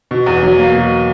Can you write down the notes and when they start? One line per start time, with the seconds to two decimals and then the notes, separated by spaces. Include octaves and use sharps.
0.11 B2
0.26 E2
0.43 F#3
0.58 A#3
0.74 B2